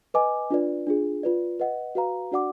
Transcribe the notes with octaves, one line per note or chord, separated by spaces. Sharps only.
B4 D#5 G#5 D6
D4 F4 B4 D5
D4 F4 G#4
F4 B4 D5
B4 D#5 F#5
F#4 B4 F5 A#5
D4 F#4 D5 F#5 D6